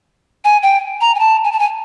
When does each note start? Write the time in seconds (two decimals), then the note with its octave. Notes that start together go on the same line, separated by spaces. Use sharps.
0.45 G#5
0.63 G5
1.01 A#5
1.15 G#5
1.19 A5
1.44 G#5
1.52 A5
1.59 G#5